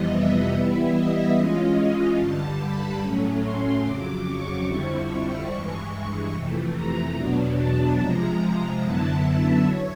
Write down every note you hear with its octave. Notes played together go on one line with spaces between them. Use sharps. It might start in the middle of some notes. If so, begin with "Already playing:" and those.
Already playing: F2 C3 E3 G3 B3 D#5
E5
E3 G3 B3 E4 E5
D#5
E3 G#3 C#4 F4 D#5
G2 D3 G3 A5
B5
A2 F#3 A3 C#4
C6
F2 C#3 F#3 D6
C#6
F2 D3 G3 C4 E4 C#6
G2 E3 G#3 C#6
F2 C3 E3 A3
A#5
E2 B2 F#3 B3 D4
A5
C3 F3 G#3 A#5
F#2 D3 F#3 B3 E4 A5
E5
C#5